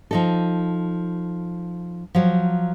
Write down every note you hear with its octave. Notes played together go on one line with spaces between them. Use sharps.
F3 D#4 A4
F3 F#3